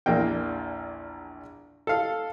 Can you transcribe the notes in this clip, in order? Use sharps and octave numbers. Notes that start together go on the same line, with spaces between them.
A#1 E2 A#3 G5
A4 F5